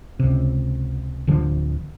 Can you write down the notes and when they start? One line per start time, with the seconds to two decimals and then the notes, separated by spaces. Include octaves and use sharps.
0.20 C#2 C3
1.27 D1 D3 F3